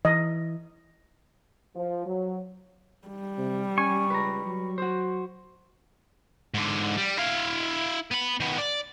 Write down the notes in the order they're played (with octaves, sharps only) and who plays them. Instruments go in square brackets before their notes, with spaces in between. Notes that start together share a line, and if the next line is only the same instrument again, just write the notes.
[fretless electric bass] E3 [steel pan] D#5
[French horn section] F3
F#3
[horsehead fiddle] G3
[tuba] C3
[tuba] C#4 [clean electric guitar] G#5 [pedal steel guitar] C#6
[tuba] C#2 [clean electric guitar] B4 A#5
[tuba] F#3
[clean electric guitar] F#4 C5
[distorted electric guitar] G#2 D3
G3
E4 F5
B3 B5
D#3 B3
D5